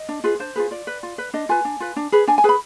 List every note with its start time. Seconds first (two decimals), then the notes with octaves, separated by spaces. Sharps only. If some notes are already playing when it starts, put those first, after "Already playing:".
Already playing: D#5
0.09 D4
0.24 F4 G#4 B4
0.39 D4 C5
0.56 F4 G#4 B4
0.71 F4 D5
0.87 B4
1.03 F4
1.18 B4
1.34 D4 D#5
1.49 F4 B4 G#5
1.65 D4
1.80 F4 B4
1.96 D4
2.12 G#4 B4
2.27 D4 G#5
2.38 G#5
2.44 G#4 B4 B5